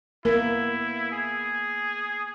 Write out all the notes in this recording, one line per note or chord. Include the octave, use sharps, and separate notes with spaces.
A#3 B3 E4 A#4
G#4